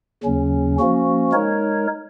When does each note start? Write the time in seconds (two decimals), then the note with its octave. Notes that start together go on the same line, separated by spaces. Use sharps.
0.24 D#2 C#3 F#3 C#4
0.79 F3 A#3 C#4 F#4
1.32 G#3 D#4 A#4 C#5